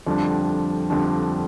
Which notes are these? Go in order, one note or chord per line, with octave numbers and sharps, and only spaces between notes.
F2 D3 G3 D4
F2 D3 G3 D4